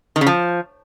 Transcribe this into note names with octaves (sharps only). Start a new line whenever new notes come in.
D#3
C#3
F3